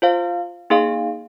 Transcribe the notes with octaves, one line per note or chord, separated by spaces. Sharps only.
F4 C5 F5
A#3 D#4 G#4 F5